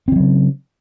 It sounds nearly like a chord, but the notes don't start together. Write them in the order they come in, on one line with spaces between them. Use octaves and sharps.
C4 E3 F#3 C#3